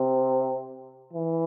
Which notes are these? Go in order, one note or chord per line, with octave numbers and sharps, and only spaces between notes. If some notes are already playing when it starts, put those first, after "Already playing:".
Already playing: C3
E3